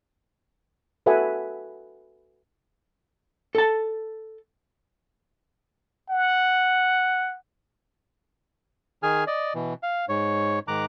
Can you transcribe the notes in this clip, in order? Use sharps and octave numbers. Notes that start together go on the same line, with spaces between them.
F#4 A4 B4 E5 F#5 G#5
A4 A5
F#5
D#3 G#4 G#5 F6
D5 D#5
B2 E3
F5
G#2 C#5
G#2 D#3 A#5 D6 F#6